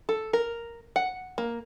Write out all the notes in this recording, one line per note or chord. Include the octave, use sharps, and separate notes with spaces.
A4
A#4
F#5
A#3